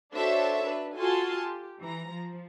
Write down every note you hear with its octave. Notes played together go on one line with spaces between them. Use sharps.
D4 F#4 A4 C5 C#5 E5
D4 B4
F4 F#4 A4 G#5 A5 C6
G4
E3 A#5
F3